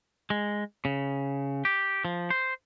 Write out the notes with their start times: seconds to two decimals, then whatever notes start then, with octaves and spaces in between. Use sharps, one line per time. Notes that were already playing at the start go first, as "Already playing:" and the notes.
0.30 G#3
0.85 C#3
1.65 G4
2.05 F3
2.30 C5